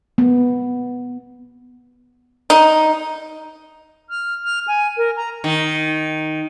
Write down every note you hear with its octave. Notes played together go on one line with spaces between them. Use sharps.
B3
D#4
F6
F6
G#5
A#4
A#5
D#3